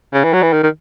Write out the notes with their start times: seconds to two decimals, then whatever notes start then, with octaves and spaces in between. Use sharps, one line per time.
0.13 C#3
0.24 E3
0.33 F#3
0.43 E3
0.53 D#3
0.63 D#3